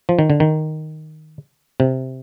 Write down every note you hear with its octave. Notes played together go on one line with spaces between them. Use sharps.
F3
D#3
D3
D#3
C3